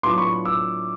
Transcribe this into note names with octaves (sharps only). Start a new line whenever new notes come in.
A2 F#3 B3 D4 F4 C6 D6
B5 C#6
D6 E6